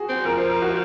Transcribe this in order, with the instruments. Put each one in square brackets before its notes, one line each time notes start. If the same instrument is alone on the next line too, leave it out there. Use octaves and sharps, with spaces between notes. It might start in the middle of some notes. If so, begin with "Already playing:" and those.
Already playing: [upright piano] F#4 G#4
[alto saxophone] C4
[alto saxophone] F3 [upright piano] A#4
[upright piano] C5
A#4
F#4